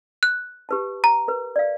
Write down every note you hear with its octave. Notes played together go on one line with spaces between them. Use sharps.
F#6
G4 B4 A5
A#5
A#4 B4
D5 F5